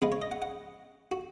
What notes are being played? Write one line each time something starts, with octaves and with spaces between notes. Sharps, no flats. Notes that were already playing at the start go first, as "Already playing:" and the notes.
C#3 G#3 B3 B4
C#5
D#5
F#5
F#5
F#4